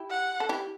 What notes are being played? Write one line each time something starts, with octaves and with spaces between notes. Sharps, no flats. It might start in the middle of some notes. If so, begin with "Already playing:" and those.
Already playing: E4 G4
F#5
A4
E4 G4